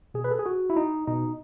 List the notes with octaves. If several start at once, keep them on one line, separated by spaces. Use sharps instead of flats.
B2 G#4
B4
A4
G#4
F#4
E4
D#4
B2 D#4